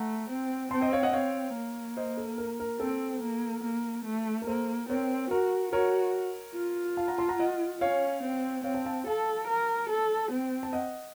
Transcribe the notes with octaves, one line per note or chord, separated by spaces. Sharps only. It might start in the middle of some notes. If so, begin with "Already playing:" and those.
Already playing: A3 F#5 A#5
C4
C4 A5 C6
C5 D#5
C#5 F5
D#5 F#5
C4 C#5 F5
A#3
C5 D#5
A4
A#4
A#4
C4 A4
A#3
A#3
A3
A#4
A#3 A4 C5
C4 A#4 C#5
F#4 A#4
F#4 A#4 C#5
F4
F5 A5
F#5 A#5
A5 C6
F#5 A#5
D#5 F#5
C#4 C#5 F5
C4
C4 C#5 F5
F5 A5
F5 A5
A4 F5 A5
A#4
A4
C4
A5
D#5 F#5